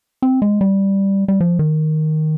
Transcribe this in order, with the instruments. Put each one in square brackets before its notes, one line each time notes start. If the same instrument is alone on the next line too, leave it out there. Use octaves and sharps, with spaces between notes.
[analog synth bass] C4
G#3
G3
G3
F3
D#3